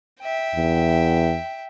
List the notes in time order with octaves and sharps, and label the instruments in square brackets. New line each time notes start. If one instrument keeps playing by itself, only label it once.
[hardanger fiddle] E5 G5
[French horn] E2